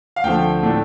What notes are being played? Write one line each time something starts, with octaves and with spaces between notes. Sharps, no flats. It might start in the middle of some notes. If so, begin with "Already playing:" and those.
F5
D2 D3 F3 A3 G5
A2 A3 D4